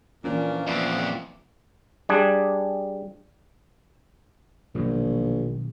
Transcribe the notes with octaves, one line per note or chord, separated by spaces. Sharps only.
A#2 E3 F3 A#3 C#4 D4
F2 A#2 B3 C5 D5 E5
G3 D4 G#4
A#1 B2 D#3 F#3